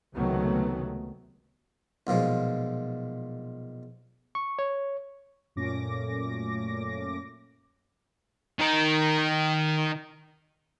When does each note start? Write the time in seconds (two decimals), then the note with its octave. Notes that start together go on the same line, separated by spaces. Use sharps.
0.16 C#2 C3 D#3 F#3 A3 B3
2.07 B1 A#2 F3 G#3
4.35 C#6
4.59 C#5
5.56 F#2 A#2 A3 C#4 D6 A#6
8.59 D#3 A#4